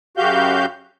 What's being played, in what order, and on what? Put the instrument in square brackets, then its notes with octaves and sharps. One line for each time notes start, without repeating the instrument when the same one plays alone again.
[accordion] F#2 C#3 F#4 G4 F5 G6